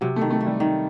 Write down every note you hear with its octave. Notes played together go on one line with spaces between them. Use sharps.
C3 F#3
A3
D#3
A3
A3
G3
D#3